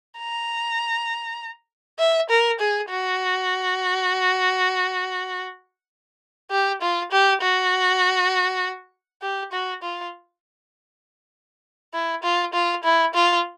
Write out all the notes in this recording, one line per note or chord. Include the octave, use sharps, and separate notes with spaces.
A#5
E5
A#4
G#4
F#4
G4
F4
G4
F#4
G4
F#4
F4
E4
F4
F4
E4
F4